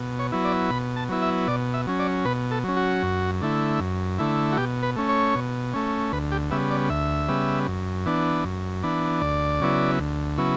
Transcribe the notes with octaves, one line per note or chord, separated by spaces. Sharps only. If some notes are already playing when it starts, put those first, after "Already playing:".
Already playing: B2
C#5
F#3 B3 E4
D5
B2 B5
A5
F#3 B3 E4
E5
B2 D5
E5
F#3 C#4
D5
B2 B4
A4
F#3 C#4
F#4
F#2
D3 A3 E4
F#2
D3 A3 E4
F#4
B2 G4
B4
A3 C#4
C#5
B2
A3 C#4
D2 B4
G4
C#3 G3 B3 E5
D5
D2 E5
C#3 G3 B3
F#2
E3 B3 D4
F#2
E3 B3 D4
D2 D5
C#3 F#3 B3 E4
D2
C#3 F#3 B3 E4